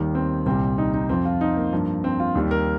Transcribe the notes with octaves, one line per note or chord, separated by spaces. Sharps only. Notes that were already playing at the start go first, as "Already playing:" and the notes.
Already playing: D#2 D#3 G3
C4
C2 A#2 G3 C4
D#4
D#4
F2 F3 C4
F4
D#4
A#3
G2 F3
C4
F4
D#2 D#3 G3
A#4